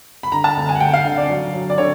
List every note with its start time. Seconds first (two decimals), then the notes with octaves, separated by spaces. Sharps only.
0.23 B5
0.32 D3 A#5
0.44 A5
0.57 D2
0.69 G#5
0.75 F#5
0.80 D2 G5
0.93 F5
1.05 D3
1.18 D5
1.29 F#3
1.54 F#3
1.70 D5
1.78 D3 C#5